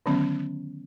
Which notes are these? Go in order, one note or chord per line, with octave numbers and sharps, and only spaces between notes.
D3 D#3 F#3 B3 C#4